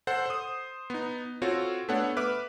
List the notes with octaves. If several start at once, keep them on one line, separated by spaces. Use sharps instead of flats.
A4 C5 F#5
C5 D#6
B3 D#4
C4 F4 F#4 A4 C#5
A3 B3 D4 A4 C#5 F#5
B4 E5 D6 F6